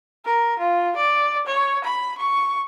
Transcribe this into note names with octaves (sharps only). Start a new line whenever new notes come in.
A#4
F4
D5
C#5
B5
C#6